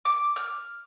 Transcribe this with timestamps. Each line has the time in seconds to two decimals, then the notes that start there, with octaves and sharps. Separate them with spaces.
0.05 D6
0.36 F6